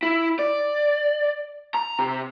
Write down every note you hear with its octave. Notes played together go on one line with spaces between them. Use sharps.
E4
D5
A#5
C3